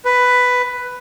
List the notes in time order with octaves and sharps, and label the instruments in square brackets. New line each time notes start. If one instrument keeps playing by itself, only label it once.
[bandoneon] B4